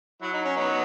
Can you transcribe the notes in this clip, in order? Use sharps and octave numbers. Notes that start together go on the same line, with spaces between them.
F#3 E4
D#4
C#4
B3 D#4